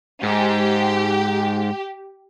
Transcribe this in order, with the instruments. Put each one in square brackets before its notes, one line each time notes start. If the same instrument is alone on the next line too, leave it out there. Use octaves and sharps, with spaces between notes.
[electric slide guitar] G#2 [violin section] G4